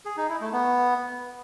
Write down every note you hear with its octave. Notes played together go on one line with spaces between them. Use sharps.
G#4
D#4
E4
A3
B3